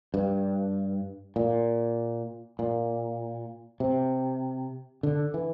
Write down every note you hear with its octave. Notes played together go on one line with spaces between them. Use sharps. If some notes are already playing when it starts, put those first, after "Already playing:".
G2
A#2
A#2
C3
D3
E3